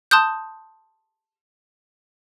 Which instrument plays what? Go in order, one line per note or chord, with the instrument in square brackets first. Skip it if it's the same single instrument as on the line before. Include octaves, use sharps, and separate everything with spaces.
[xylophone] A5 C6 D#6 F#6 G6